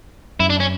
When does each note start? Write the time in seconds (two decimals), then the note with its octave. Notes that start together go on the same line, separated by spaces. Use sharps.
0.40 F#2 E4
0.50 D4
0.60 C#4